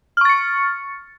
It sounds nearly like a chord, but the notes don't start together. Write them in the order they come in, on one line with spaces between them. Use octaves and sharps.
F6 C#6 A6 C#7